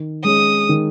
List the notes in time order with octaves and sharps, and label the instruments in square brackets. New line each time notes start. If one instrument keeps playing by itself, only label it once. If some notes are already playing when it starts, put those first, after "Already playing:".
Already playing: [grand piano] D#3
[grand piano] G#3 C#4 G#4 [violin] D#6
[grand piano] D#3